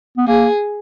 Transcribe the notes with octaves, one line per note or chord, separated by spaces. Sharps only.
B3
A#3 G#4